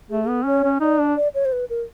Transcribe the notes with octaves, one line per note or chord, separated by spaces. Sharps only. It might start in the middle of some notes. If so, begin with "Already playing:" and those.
A3 G#4
G#4
B3 A4
C#4 C#5
C#4
D#4 D5
D4
D5
C#5
C5
B4
A#4